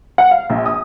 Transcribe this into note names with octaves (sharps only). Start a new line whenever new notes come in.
F#5
F5
A#1
D#6